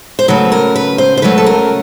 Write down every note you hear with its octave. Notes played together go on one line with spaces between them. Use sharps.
C5
C#3 F#3 A3 B4
A#4
B4
C5
C5
C#3 F#3 A3 B4
A4
A#4